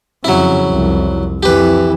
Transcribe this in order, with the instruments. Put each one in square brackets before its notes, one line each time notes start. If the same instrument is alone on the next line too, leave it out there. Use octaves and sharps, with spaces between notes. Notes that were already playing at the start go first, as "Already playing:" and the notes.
[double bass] F2 C#3 [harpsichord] F#3 E4
[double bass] C2 F2
[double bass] F2 E3 [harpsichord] G4 B4